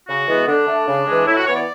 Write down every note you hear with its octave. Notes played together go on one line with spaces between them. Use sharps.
C#3 F#4
E3 G#3 B3
D3 D4
A3
C#3
E3 G#3
A2 E4
F#4
E3 B3 C#5
D5